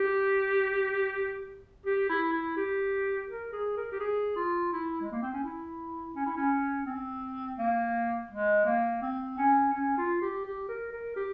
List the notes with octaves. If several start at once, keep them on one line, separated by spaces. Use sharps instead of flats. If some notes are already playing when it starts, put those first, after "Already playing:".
Already playing: G4
G4
E4
E4
G4
A#4
G#4
A#4
G4
G#4
F4
E4
G#3
A#3
C4
C#4
E4
C#4
E4
C#4
C4
A#3
G#3
A#3
C4
C#4
C#4
F4
G4
G4
A#4
A#4
G4